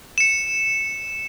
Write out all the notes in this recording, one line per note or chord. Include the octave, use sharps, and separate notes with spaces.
C#7 E7